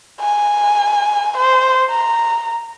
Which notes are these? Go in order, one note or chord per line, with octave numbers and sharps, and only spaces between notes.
G#5
C5
A#5